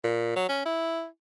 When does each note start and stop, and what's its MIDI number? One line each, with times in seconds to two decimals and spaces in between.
0.04 0.32 46
0.36 0.48 54
0.49 0.64 61
0.65 1.06 64